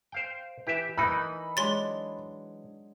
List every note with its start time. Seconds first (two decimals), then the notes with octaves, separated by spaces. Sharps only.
0.12 C5 F5 G5
0.67 E3 G4 E5
0.97 E3 D#4 A#4 B5
1.57 F#3 G#3 D4 C6 A6